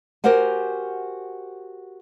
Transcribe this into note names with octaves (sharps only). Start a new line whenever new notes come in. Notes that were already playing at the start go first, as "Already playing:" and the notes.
F#4 G4 A#4 C5 F#5 G#5